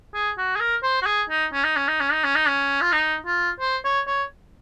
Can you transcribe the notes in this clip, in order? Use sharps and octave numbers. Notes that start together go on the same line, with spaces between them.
G#4
F#4
G#4
A#4
C5
F#4
G#4
D#4
C#4
D#4
C#4
D#4
C#4
D#4
C#4
D#4
C#4
F4
D#4
F4
C5
C#5
C#5